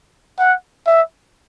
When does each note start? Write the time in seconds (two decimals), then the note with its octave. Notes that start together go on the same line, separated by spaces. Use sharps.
0.39 F#5
0.87 E5